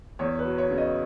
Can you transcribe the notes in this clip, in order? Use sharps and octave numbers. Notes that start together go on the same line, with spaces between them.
E2 C#5
B4
F#3
C#5
C#3
D#5